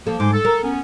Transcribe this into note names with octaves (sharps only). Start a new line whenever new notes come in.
F3 A#3 A4
G#2 C5 G#5 D6
A4
A#4
B3 C#4